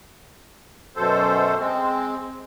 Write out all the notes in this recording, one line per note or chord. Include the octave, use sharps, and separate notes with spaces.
F#2 B2 A4 C5
G#3 C4